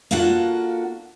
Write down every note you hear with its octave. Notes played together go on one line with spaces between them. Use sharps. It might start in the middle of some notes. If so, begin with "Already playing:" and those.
A#3 D4 F4 F#4 A4 F#5